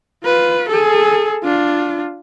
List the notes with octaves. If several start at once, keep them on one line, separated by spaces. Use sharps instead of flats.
F4 B4
G#4 A4
D4 F4